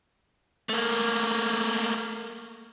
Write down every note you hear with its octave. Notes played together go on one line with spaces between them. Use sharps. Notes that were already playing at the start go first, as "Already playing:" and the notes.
A3 A#3